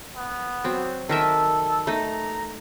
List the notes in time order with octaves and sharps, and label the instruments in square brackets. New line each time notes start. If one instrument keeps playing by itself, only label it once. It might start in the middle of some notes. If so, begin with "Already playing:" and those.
[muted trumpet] B3
[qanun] F#3 C4
[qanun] D#3 A#4 E5 [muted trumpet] A4
[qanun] A3 D#4 [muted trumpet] A#5